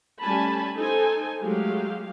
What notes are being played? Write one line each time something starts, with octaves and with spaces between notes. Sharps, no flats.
G3 A3 C#4 G#5 A5 B5
D#4 A4 C5 G#5
F#3 G#3 A3 G4 F5